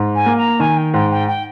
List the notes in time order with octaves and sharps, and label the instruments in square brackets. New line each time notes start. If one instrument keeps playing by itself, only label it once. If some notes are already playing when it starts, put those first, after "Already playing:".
Already playing: [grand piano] G#2
[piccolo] G#5
[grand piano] A#3
[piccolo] A#5
[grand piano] D#3 [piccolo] G#5
[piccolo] G5
[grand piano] G#2 [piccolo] G5
[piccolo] G5
G5